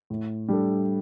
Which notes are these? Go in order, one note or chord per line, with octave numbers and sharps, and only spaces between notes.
A2
G3 D4 A4